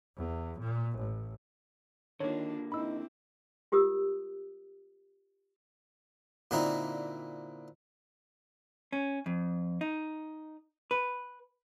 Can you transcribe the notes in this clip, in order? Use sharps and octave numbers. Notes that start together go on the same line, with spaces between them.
E2
A#2
A1
D3 D#3 A#3 D4 F4 C#5
C4 D#4 E4 B5 E6
F4 G4 A#4 D#6 E6
A#2 D3 C4 D#4 E4
C#4
F2
D#4
B4